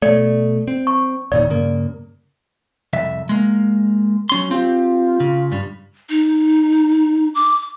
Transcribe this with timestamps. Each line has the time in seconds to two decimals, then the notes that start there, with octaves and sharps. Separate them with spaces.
0.02 B2 A3 D5
0.68 C4
0.87 C#6
1.32 D#1 A#2 D#3 D5
1.50 G2 C#3 A#3
2.93 C2 F2 E5
3.29 G#3 A#3
4.29 F#3 C#4 C6
4.51 C4 F4 G4
5.20 C#3
5.51 G2 G3
6.10 D#4
7.35 D6